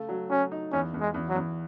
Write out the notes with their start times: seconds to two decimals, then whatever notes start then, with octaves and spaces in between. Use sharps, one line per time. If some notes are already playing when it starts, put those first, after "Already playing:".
Already playing: C#3 A3
0.09 F#3
0.30 F#3 C#4
0.52 D#4
0.72 E2 C#4
0.94 E2
1.00 G#3
1.14 E2
1.29 F#3
1.35 E2